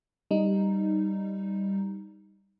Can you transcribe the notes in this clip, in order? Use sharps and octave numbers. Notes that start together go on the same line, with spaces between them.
G3 D#4